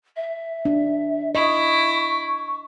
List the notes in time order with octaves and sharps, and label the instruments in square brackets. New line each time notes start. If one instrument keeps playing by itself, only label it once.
[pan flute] E5
[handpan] D4
[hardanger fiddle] E4 [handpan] D#5 [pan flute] C#6